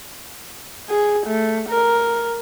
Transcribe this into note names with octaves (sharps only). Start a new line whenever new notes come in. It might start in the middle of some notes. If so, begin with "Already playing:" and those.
G#4
A3
A#4